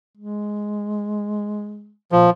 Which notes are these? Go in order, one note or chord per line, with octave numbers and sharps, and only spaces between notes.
G#3
A#2 F3